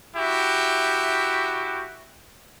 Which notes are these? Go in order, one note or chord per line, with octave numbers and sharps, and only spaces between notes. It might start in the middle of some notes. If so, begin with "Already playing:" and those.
E4 F#4 G4